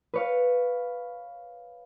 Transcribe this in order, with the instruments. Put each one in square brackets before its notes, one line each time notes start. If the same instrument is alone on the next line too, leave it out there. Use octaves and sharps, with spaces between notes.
[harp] B4 C#5 F5